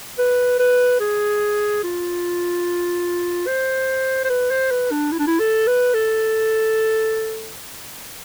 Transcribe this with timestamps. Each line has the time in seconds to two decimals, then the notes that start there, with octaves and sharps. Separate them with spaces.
0.19 B4
0.60 B4
1.00 G#4
1.84 F4
3.47 C5
4.25 C5
4.30 B4
4.51 C5
4.71 B4
4.91 D4
5.12 E4
5.19 D4
5.27 E4
5.40 A4
5.67 B4
5.94 A4